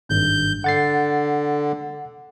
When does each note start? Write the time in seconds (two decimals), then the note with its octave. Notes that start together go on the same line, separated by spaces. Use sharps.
0.10 G#1 G2 G6
0.64 D3 F#5 A6 C7